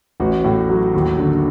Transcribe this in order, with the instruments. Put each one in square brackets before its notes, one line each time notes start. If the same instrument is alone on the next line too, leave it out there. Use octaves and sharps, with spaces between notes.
[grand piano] A1 F#4
A2
F#3
D#2
D3